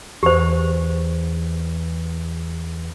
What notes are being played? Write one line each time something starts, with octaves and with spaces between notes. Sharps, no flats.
E2 G4 C5